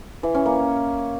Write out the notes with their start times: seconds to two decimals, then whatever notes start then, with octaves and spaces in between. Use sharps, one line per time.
0.23 E3
0.34 C#4
0.46 A#3